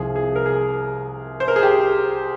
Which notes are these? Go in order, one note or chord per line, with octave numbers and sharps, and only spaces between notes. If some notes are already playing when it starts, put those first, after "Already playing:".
Already playing: C2 C3 F3 G#4
G#4
A#4
G#4
C5
A#4
G#4
G4